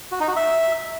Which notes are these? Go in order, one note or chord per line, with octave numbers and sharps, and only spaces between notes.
F#4
D#4
F#4
E5